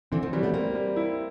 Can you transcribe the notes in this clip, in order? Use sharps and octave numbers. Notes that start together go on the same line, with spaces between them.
D3 E3 C4
D#3 F3
E3 F#3 G3
A3 B3
G3 A#3 C4
G3
E4